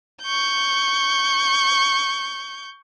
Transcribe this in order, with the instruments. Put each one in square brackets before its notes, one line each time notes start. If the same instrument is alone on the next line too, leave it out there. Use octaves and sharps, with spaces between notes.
[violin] C#6 G6